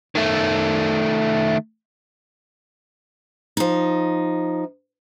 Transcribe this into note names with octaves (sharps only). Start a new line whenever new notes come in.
D#3 A3
F3 D#4